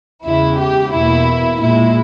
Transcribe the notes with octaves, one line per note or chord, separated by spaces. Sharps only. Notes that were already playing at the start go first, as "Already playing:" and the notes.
E2 C#3 G#3 E4
G4
E2 B2 A#3 E4
A#2 G#3 E4